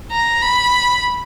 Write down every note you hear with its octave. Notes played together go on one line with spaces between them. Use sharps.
A#5
B5